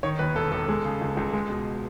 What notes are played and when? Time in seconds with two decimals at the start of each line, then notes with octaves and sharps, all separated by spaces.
0.03 D#3 C#5
0.19 D#2 B4
0.35 E1 A4
0.52 E1 A4
0.68 G#3
0.85 C#3
1.01 C#2
1.17 C#2
1.33 G#3
1.50 B2